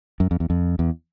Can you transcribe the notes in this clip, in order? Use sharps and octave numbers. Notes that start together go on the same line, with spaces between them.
F#2
F2
E2
F2
E2